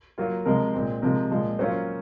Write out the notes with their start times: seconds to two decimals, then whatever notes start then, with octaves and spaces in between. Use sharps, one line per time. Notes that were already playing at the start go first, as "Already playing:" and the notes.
0.18 F#3 A#3 F4
0.45 C3 F3 G#3 A#4
0.74 A#2 G#3 C4
1.02 C3 F3 G#3 A#4
1.30 A#2 F3 G#3
1.59 F#3 A#3 C#4 F4 C5